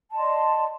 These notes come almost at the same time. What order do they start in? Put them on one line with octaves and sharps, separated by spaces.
A5 D#5 C6 D5